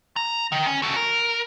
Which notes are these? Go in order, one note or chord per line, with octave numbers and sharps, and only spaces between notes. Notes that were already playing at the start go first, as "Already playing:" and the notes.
A#5
D#3
C#4
F#4 A4
A#4